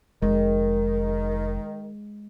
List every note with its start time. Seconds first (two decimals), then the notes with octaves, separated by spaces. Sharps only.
0.22 F1 D#3 G#3